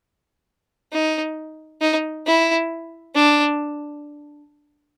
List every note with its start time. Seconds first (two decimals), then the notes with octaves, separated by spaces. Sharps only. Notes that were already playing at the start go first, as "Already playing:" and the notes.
0.92 D#4
1.81 D#4
2.26 E4
3.15 D4